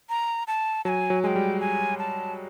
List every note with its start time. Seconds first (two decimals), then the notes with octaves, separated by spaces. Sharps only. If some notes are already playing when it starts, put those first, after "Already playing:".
0.09 A#5
0.47 A5
0.85 F#3 G#5 A5
1.10 F#3
1.23 G#3 G5 G#5
1.36 G3
1.61 G#5
1.99 A5